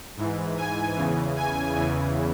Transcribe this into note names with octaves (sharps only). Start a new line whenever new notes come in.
G#2 E3
G#5
E2 C#3 E3
G#5
E2 C#3 E3